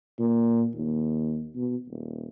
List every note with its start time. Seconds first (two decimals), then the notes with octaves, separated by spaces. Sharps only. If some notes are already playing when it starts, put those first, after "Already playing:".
0.19 A#2
0.74 D#2
1.56 B2
1.89 D#1